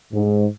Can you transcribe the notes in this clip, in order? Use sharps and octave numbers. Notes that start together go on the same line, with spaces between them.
G#2